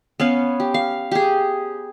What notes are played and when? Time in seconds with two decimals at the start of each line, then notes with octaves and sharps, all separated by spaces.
0.20 B3 C#4 F5
0.60 G4
0.74 F5
1.11 G4 G#4